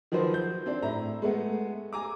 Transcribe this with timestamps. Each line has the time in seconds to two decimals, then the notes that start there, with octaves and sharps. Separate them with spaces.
0.12 D#3 F3 F#3 B4 C5
0.34 G6
0.66 C4 D4
0.82 A2 E4 A#5
1.22 G#3 A3 B3
1.93 G#5 A#5 D6